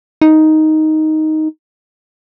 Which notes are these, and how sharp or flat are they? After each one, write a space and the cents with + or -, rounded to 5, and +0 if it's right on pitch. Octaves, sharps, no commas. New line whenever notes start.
D#4 +5